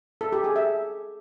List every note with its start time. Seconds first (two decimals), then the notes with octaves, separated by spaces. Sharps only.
0.21 A4
0.33 G4
0.44 G#4
0.56 E5